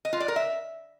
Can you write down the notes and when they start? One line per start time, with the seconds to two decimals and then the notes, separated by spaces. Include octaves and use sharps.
0.05 D#5
0.13 F4
0.20 D5
0.28 A#4
0.36 E5